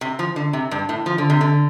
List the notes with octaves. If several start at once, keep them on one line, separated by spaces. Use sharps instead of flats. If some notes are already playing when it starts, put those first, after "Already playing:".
C3
F3
D3
C3
G2
A2
F3
D3
C3
D3